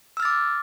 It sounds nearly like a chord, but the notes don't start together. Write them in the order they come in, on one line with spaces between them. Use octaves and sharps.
E6 F6 A6 D6